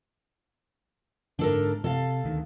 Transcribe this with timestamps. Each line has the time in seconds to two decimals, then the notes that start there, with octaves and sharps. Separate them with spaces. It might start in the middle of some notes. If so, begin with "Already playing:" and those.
1.39 G#2 D3 D4 A4 A#4
1.84 C3 A4 F5
2.24 D2 D#3